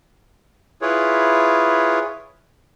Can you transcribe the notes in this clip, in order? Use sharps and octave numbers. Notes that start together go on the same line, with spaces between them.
E4 F4 G#4 B4 C#5